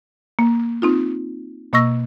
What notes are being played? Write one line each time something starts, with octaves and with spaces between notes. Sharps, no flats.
A#3
C4 D#4 F4
B2 A#3 D#5 C#6 E6 A#6